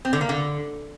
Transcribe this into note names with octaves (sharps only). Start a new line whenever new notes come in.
C4
D3
A#3
D3